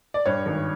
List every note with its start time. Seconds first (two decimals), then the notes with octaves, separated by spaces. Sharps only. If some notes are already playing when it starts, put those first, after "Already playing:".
0.14 D5
0.26 G2 C#5
0.46 G#1